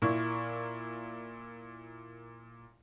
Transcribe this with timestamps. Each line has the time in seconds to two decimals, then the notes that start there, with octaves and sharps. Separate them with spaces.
0.02 A#2 E4 A#4 C#6